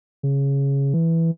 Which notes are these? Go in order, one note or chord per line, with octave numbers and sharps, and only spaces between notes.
C#3
E3